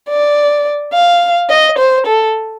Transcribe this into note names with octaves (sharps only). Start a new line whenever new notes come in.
D5
F5
D#5
C5
A4